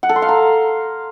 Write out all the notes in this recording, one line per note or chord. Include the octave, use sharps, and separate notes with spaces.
F#5
A4
C6
F5
A#5